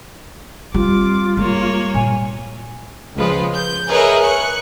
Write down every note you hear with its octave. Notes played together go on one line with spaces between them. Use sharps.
G3 C4 F4 D6
G#3 A#3 C#5
A#2 G#5
C#2 F3 G#3 F4 B4
G6
G#4 A#4 B4 C#5 D#5 E5
C#6 F#6 C#7